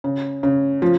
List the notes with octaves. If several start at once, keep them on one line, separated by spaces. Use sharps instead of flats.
C#3
C#3
F3